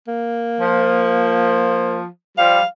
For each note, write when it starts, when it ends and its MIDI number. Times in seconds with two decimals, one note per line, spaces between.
0.08 2.01 58
0.59 2.05 53
2.38 2.60 53
2.38 2.60 55
2.38 2.65 77